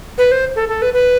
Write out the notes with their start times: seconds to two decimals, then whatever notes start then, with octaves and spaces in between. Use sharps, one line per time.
0.18 B4
0.32 C5
0.56 A4
0.69 A4
0.82 B4
0.94 B4